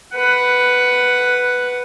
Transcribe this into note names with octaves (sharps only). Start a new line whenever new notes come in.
B4 F#5